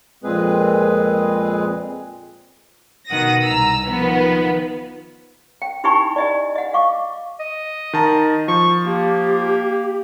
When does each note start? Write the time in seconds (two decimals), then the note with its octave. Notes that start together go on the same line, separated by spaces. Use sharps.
0.24 F2 A#2 G#3 C4 G#4 B4
3.08 B2 D#3 F#5 D#6 A#6
3.44 C2 A#5 E6
3.87 D#3 F3 B3
5.62 G5
5.84 D#4 E4 G4 G#5 B5 C#6
6.16 D5 D#5 G#5
6.56 D#5 F#5
6.73 F5 C#6 D6
7.40 D#5
7.93 D#3 A5 A#5
8.48 F3 C#6
8.86 A#3 G4